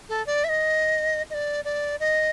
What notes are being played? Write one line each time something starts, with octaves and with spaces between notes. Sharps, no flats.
A4
D5
E5
D#5
D#5
D5
D5
D#5